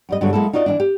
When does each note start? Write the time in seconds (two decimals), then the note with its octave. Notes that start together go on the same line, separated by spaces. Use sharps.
0.09 F#2 G3 D#5
0.21 G2 D3 F#3 G#3 F#4
0.33 F#3 G#3 A#3 E4 A4
0.53 D#4 F4 F#4 D5 D#5
0.66 E3 F#3 D4
0.80 G4